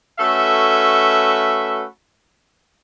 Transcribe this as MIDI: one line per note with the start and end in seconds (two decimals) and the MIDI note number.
0.20 1.84 57
0.20 1.84 61
0.20 1.84 66
0.20 1.84 69
0.20 1.84 71
0.20 1.84 76